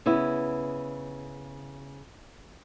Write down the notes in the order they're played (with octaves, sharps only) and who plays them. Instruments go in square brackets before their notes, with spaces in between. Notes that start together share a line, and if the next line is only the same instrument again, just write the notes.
[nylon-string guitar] C#3 B3 E4